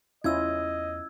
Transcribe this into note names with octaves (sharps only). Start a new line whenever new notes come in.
E2 C#4 E4 F4 D#5 E6 G#6